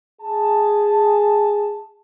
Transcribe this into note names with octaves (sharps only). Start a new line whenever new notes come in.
G#4 A5